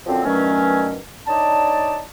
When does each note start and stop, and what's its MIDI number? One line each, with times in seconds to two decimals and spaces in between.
0.06 0.22 42
0.06 0.22 50
0.06 0.22 53
0.06 0.22 60
0.24 0.97 43
0.24 0.97 47
0.24 0.97 51
0.24 0.97 54
0.24 0.97 57
0.24 0.97 61
1.27 2.00 62
1.27 2.00 63
1.27 2.00 73
1.27 2.00 74
1.27 2.00 81